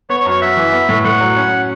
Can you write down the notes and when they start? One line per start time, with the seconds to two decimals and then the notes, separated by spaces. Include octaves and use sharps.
0.09 B3 C#5
0.20 C#5
0.25 F#2
0.31 C#5
0.41 F#4 E5
0.57 E3
0.72 B3
0.89 A2
1.04 A2 F#5
1.21 F#3
1.37 C#4